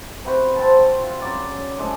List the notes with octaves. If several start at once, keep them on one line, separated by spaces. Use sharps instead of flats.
C3 F#4 B4 C5
C4 A5
F4
C#3 F#3 D5
A2 G#3 D4